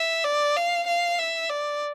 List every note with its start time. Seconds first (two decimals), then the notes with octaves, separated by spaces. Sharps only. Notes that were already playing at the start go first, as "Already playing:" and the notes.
Already playing: E5
0.24 D5
0.56 F5
0.87 F5
1.19 E5
1.50 D5